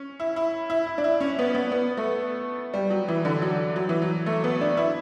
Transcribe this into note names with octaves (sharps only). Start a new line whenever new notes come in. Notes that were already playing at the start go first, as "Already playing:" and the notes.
Already playing: C#4
E4
E4
E4
E4
D4
E4
C#4
B3
B3
B3
A3
G3
F#3
E3
D3
F#3
F#3
E3
F#3
A3
B3
D4
E4